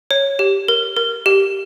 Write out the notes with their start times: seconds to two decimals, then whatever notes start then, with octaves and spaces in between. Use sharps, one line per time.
0.11 C#5
0.39 G4
0.68 A#4
0.97 A#4
1.26 G4